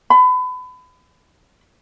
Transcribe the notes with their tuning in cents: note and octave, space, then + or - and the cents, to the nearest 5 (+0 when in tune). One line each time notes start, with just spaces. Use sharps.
B5 +30